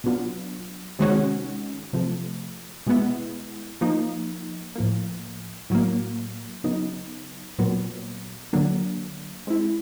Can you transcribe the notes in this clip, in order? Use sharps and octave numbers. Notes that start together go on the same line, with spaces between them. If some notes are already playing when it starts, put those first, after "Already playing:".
B2 F#3 B3 D4 F4
C3 D#3 G#3 C#4 F#4
C3 F3 A3
B2 G#3 B3 E4
F3 A#3 D#4
A2 F3 A#3
A2 F#3 A#3
C#3 F#3 B3 D#4
A#2 F#3 B3
D3 F#3 A#3 D4
G#3 C4 E4